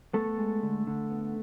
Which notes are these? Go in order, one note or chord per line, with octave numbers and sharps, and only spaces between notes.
A3 B3 A4
G#3
D3
D3
B3